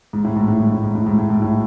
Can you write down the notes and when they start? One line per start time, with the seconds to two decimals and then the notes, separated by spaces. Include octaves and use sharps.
0.13 G#2
0.24 A2
0.36 G#2
0.48 A2
0.60 G#2
0.72 A2
0.84 G#2
0.95 A2
1.06 G#2
1.18 A2
1.30 G#2
1.42 A2